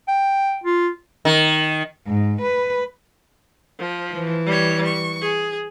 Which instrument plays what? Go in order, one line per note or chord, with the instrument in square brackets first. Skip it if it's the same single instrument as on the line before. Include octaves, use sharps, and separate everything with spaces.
[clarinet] G5
F4
[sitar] D#3
[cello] G#2
B4
[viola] F3
[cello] E3
[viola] G3 C#5
C#6
G#4